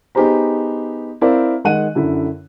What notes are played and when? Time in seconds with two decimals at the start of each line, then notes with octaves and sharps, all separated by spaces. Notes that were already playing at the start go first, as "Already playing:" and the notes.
0.15 B3 D#4 G4 G#4 C5 A#5
1.21 C4 E4 A#4 C5 D5 F5
1.64 D#3 G#3 F#5 F#6 D#7
1.95 F#2 D3 E4